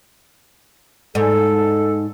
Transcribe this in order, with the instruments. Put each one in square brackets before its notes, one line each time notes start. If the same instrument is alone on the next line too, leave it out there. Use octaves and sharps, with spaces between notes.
[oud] G#2 [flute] A4